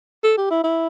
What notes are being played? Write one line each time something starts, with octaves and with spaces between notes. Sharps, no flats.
A4
G4
E4
E4